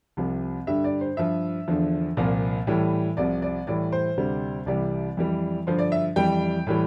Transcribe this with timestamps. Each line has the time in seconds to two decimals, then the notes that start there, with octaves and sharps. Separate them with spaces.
0.17 C2 C3 F3
0.67 G2 D3 G3 E5
0.84 D5
1.01 C5
1.17 G2 F3 E5
1.68 E2 D3 F3
2.17 C2 A#2 F3
2.67 A2 E3 G3
3.17 C2 C3 F3 D5
3.42 D5
3.67 A2 E3 G3 D5
3.92 C5
4.17 D2 C3 G3
4.66 C2 C3 E3 G3 D5
5.17 F2 E3 G3
5.67 G2 D3 F3 C5
5.79 D5
5.92 E5
6.16 F2 E3 G3 G5
6.67 A2 E3 G3